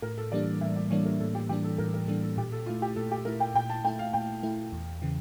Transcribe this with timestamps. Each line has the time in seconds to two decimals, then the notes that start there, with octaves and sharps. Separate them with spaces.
0.02 A2 A#4
0.18 A4
0.32 E3 G3 A#3 D4 D5
0.61 A2 E5
0.76 D5
0.91 E3 G3 A#3 D4 C#5
1.05 A#4
1.20 A2 A4
1.35 G4
1.49 E3 G3 A#3 D4 G4
1.64 A4
1.78 A2 A#4
1.94 A#4
2.08 E3 G3 A#3 D4 A4
2.23 A4
2.37 A#2 G4
2.52 A4
2.66 A3 E4 F4
2.82 G4
2.96 A#2 A4
3.12 G4
3.25 A3 E4 A#4
3.40 G5
3.55 A#2 G5
3.70 A5
3.84 A3 E4 G5
3.99 F5
4.13 A#2 G5
4.43 A3 E4
4.72 E2
5.02 C#3 E3